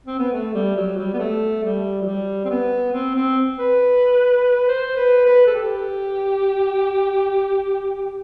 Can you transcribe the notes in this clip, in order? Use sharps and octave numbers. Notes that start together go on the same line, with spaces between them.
C4
B3
A3
G3
F#3
G3
B3
A3
G3
F#3
G3
C4
B3
C4
C4
B4
C5
B4
B4
A4
G4